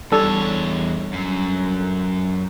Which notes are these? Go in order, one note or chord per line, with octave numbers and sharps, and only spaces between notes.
E2 G3 D4 A4 C#5
F#2